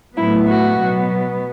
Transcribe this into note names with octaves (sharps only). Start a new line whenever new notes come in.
A2 F#3 B3 E4
F#4
B2 F#3 B3